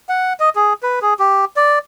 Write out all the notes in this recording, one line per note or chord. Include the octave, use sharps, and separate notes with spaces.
F#5
D#5
G#4
B4
G#4
G4
D5